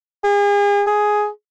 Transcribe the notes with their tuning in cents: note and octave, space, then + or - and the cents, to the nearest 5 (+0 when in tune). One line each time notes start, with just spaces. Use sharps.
G#4 -35
G#4 +5